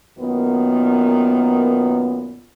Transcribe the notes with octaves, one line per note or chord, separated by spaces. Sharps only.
F#2 A#2 D#3 B3